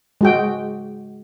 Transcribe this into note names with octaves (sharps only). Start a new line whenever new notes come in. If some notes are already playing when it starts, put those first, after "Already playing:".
G#3 F#4 G5